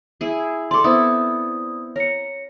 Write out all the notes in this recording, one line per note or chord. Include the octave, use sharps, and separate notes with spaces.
E4 G#4
A4 D5 C6 D6
B3 C4 E4 D5 D#6
A#4 C#5 C#7